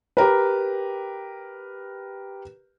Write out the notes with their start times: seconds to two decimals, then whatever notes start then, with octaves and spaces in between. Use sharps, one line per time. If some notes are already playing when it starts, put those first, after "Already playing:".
0.17 G4 A#4 B4